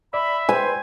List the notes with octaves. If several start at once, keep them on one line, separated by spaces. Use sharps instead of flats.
D5 E5 B5
B4 C5 G#5